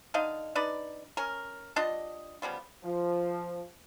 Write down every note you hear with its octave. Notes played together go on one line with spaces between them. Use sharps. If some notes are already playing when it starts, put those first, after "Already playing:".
D3 D#4 D#5 F5
D4 D#4 B4 D5
C#4 A#4
G3 D4 F4 D#5
C#3 F3 G3 B3
F3